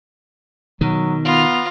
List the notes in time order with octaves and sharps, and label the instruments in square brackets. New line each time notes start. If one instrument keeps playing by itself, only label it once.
[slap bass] B2 D#3 [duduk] F#3
[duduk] B3 [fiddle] F4 A#5